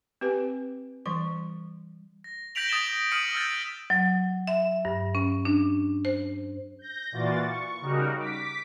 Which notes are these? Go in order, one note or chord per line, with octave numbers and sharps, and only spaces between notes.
C4 G4 B4 G#5
E3 G3 C#6
A#6
G6 A#6 B6 D7 F7 F#7
D#6 A6 D7 E7 G7
D#6 F6 C#7 D#7 F#7
E6 F6 G6 A6
F#3
E5
G2
C#4
D4
C5
G6 A#6
A#2 E3 F4 F#4 D5 A6
C#6
C#3 G3 D#4 F#4 A#4
D6 B6